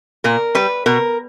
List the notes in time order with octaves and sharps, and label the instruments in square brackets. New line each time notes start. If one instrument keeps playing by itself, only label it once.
[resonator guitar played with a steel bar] A#2 A#4
G3 B4
B2 A#4